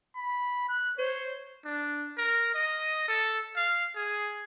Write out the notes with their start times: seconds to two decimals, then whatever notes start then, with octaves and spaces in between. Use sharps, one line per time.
0.16 B5
0.69 F#6
0.99 C5 C#5
1.65 D4
2.18 A#4
2.54 D#5
3.08 A4
3.56 F5
3.96 G#4